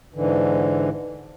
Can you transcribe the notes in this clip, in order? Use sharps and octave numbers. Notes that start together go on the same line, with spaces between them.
G#2 D3 E3